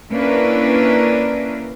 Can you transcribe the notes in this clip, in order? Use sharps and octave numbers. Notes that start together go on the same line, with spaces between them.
A#3 C#4 D4 E4 A#4 B4